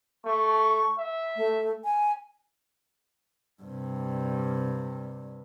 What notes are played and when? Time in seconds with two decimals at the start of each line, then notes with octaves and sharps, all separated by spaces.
0.25 A3 C#6
0.98 E5
1.36 A3
1.84 G#5
3.63 G2 C3